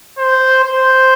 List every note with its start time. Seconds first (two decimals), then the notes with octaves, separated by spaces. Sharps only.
0.18 C5
0.64 C5